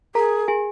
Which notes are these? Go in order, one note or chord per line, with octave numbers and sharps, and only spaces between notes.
G#4 A#4 A#5
G#4 G#5